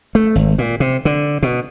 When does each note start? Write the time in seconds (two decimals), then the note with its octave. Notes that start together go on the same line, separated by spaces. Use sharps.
0.15 A3
0.35 G#1
0.58 A#2
0.80 C3
1.05 D3
1.43 B2